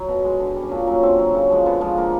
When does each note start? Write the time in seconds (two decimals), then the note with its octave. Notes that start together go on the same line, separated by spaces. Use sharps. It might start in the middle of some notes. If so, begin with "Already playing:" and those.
Already playing: F#3
0.09 B2
0.25 G#3
0.40 D3
0.56 G3
0.63 C#4
0.71 A#2 D4
0.87 F#3 C#4
1.03 D3 C4
1.19 F#3
1.35 C#3
1.50 F3 G#3
1.66 D3 B3
1.81 F3 G#3
1.97 D3 A#3